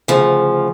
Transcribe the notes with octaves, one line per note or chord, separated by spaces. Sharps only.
D2 C#3 F3